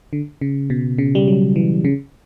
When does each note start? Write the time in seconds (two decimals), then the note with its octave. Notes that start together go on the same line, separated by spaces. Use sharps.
0.13 D3
0.41 C#3
0.70 B2
0.98 C#3
1.15 G3
1.28 F#3
1.56 E3
1.85 C#3